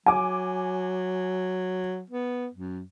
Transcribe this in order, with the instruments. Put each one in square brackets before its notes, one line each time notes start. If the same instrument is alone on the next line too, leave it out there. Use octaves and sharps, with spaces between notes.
[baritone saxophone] F#3 [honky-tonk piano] G#5 D6
[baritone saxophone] B3
F#2